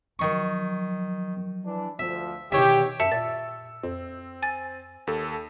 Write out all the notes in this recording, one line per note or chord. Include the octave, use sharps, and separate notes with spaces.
D#3 F3 F#3 C#6
E3 D4
D2 F3 E5
E2 B2 D#3 G4 C#5 E5
F#2 E5 A5 E6 C#7
A#2 A6
F2 C4
G#5 A6
D#2 A4